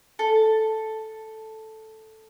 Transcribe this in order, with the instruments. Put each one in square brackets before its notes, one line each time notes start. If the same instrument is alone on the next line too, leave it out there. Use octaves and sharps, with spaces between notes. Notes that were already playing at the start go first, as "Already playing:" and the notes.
[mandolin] A4